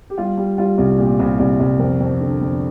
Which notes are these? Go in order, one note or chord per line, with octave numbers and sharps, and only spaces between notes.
G4
G3 F4
G3
G3 F4
C2
A#2 G4
C2
C2
C2
F2 A#4
F2
D3
F2